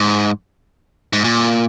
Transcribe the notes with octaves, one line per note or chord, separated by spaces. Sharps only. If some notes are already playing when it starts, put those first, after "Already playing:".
Already playing: G#2
G#2
A#2